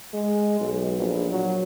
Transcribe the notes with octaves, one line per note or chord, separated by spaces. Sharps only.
G#3
B1
A#1
F#3